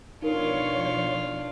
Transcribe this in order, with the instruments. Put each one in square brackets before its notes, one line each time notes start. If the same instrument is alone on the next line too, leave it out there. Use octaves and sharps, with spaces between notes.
[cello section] B2 F3 C#5 [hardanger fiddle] D4 F4 [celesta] D#4 A#4